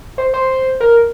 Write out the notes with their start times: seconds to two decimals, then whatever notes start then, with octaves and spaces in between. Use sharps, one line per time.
0.18 C5
0.34 C5
0.80 A#4